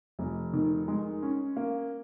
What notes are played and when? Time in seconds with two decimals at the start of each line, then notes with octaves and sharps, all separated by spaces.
0.19 F1
0.53 D#3
0.88 G#3
1.23 C#4
1.57 A#3